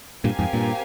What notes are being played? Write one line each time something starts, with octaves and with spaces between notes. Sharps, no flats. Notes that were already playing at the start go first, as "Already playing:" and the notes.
G2 A#2 C4 G4 A#4 F5 G#5
F2 G#2
G2 A#2